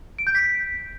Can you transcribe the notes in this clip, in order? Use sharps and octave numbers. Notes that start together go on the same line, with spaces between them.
D7
G6
B6